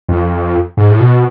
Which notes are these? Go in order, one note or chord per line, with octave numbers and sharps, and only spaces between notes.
F2
G#2
A2
B2